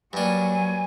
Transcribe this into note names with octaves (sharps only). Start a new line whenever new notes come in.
G2 F#3 A#3 D4 G#5